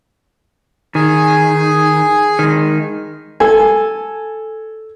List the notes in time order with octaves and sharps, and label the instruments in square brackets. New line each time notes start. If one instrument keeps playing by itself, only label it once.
[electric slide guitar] D#3 [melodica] G#4 G#5
[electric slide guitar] D#3 G#3
[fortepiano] A4 G#5